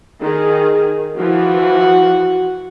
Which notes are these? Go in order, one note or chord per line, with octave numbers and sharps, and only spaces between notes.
D#3 G#4
E3 F3 F#4